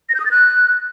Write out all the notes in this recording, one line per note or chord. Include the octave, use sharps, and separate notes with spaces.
A#6
G6
D#6
A6
F#6